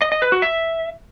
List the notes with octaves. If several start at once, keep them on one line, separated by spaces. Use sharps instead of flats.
D#5
D#5
B4
F#4
E5